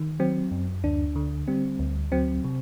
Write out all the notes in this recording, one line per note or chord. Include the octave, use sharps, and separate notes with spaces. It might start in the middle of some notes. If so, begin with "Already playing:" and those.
Already playing: D#3
F#3 C4
F#2
D2 D4
D3
G3 C4
D2
F#3 C4
C3